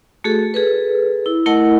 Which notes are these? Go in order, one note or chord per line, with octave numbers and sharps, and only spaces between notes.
A3 F#4 G#4 A4
G#4 A4 B4
E4
A3 E4 A#4 D#5 F#5 A5